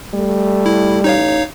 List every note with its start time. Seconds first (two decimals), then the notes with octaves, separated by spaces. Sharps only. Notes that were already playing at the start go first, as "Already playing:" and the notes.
0.14 G3 A3
0.66 E4
1.04 A1 D#4 C#5 F5